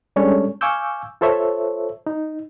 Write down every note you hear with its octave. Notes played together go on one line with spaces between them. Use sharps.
G3 G#3 C#4 D4 A4 C#5
F5 G#5 C#6 D6 E6 G6
F4 A4 C5 C#5 E5
D#4